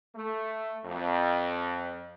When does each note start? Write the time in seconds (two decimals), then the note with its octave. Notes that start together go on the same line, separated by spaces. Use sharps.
0.16 A3
0.86 F2